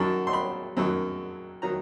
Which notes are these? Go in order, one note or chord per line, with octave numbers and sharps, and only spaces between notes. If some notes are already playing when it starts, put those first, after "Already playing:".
Already playing: F#2 D#3 F#3 A5
C6
B5
F#2 D#3 F#3
D#3 F#3 A#5